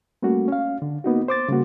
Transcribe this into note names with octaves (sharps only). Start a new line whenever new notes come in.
G3 A3 A#3 C#4 F#4
C#4 F5
D3
A#3 B3 D#4 F#4
C5 D6 A6
C#3 G3 A#3 F#4